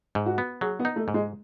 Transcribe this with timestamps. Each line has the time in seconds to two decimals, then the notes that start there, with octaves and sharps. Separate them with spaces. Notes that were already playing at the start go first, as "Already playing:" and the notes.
0.15 G#2
0.26 F#4
0.38 B3
0.61 F#3 G#4
0.79 B3
0.85 D#4
0.96 A3
1.08 G#2
1.14 G#3